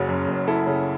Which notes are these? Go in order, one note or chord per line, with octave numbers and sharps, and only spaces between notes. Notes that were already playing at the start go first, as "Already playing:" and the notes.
Already playing: F#1 C#3 F#4
F#2
F#1
F#1 E4 A4
C#3